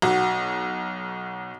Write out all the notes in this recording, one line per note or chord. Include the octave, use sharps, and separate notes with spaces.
B1 F#4